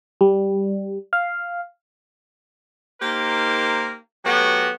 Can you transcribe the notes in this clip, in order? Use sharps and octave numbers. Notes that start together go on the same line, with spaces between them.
G3
F5
A#3 D#4 G4 A#4 C5
F#3 A3 B3 F#4 G4